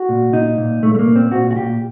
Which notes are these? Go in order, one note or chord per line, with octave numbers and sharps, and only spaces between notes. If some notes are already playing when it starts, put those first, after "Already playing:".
Already playing: F#4
A#2
A#2 D#4
A#2
A#2 A3
A3
A#3
A#2
C4
A#2 F#4
F#4
A#2 G4